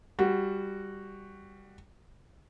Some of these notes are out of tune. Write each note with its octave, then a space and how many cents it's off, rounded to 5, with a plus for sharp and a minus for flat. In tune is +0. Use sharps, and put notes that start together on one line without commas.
G3 +5 F#4 +0